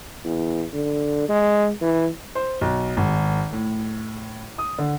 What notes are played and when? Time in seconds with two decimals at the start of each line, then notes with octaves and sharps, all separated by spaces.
0.25 E2
0.74 D3
1.29 G#3
1.81 E3
2.35 C5
2.61 B1
2.97 G#1
3.52 A2
4.58 D#6
4.78 D3